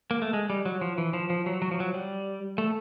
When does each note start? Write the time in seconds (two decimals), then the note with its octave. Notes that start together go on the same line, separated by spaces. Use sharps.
0.11 A#3
0.22 A3
0.33 G#3
0.50 G3
0.66 F#3
0.81 F3
0.98 E3
1.13 F3
1.30 F3
1.46 F#3
1.62 F#3
1.71 F3
1.80 F#3
1.94 G3
2.58 A3